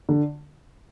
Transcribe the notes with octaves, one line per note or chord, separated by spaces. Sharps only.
D3